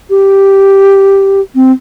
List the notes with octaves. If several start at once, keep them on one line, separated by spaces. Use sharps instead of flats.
G4
C4